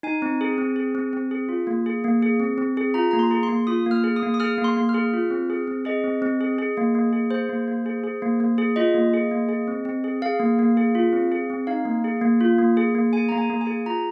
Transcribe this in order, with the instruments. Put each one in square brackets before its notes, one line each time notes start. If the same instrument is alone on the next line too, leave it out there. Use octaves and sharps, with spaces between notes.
[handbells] D#4 G#5
C4
G#4
C4
G#4
C4
C4
G#4
F4
A#3
G#4
A#3
G#4
C4
C4
G#4
F4 A#5
A#3 A#5
C6
G#4
C6
A#3
F4 D#6
A#3 F6
G#4
D#6
A#3
D#6
G#4 F6
A#3
C6
A#3
F6
G#4
F4
C4
G#4
C4
G#4 D#5
C4
C4
G#4
G#4
A#3
A#3
G#4
G#4 C5
A#3
A#3
G#4
G#4
A#3
A#3
G#4
F4 D#5
A#3
G#4
A#3
G#4
C4
C4
G#4
G#4 F5
A#3
A#3
G#4
F4
C4
G#4
C4
D#4 F5
A#3
G#4
A#3
F4
A#3
G#4
A#3
G#4 G#5
A#3 A#5
G#5
A#3
G#5
G#4
F4 A#5